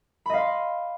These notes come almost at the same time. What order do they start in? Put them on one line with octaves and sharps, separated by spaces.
B5 D#5 F5 C6